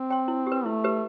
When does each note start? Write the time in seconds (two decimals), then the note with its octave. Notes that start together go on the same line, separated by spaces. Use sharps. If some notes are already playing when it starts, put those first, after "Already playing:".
Already playing: C4
0.10 G5 C6
0.28 E4
0.47 G4
0.52 B4
0.65 A3 E4
0.84 G4 B4